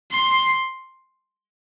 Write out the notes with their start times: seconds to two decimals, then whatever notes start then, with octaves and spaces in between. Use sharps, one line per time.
0.11 C6